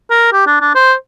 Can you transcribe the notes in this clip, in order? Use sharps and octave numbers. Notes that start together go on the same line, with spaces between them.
A#4
G4
D4
D4
C5